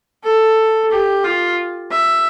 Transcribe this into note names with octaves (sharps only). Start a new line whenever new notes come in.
A4
G4
F4
E5